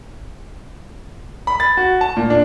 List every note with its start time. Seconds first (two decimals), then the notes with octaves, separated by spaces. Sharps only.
1.47 B5
1.60 A6
1.77 F#4
2.01 A5
2.17 A#2
2.30 D4